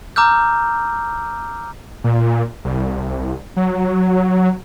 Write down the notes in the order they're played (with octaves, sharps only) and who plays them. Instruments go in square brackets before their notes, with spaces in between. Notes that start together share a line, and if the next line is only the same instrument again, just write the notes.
[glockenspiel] A#5 D6 E6 F6 G6
[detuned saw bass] A#2
C2
F#3